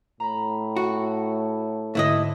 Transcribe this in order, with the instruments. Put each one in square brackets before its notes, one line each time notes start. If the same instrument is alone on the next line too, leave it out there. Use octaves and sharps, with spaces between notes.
[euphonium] A2 [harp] A#5 B5
[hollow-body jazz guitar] F#4 [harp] C#7
[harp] G#2 D3 [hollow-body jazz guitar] A3 E4 D#5